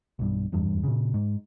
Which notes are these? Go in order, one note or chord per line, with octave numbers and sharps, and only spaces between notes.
B1 G2
F1 E2 G2
A#2 C#3
G#2